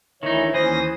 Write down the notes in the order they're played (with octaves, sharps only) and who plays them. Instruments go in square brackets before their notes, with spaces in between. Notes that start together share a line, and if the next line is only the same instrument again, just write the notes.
[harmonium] D2 E3 [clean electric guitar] D#3 D#4 [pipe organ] E4 [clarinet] C#5
[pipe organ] D#2 D#6 A#6 [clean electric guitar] E3 [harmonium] C#4 [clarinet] C5